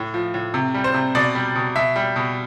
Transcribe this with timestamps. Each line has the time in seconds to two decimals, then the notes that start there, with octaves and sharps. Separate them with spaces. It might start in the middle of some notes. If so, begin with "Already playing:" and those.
Already playing: A2
0.14 F3
0.34 A2
0.54 C3
0.74 G3
0.84 C5
0.94 C3
1.15 B2 D5
1.35 G3
1.55 B2
1.75 B2 E5
1.96 G3
2.16 B2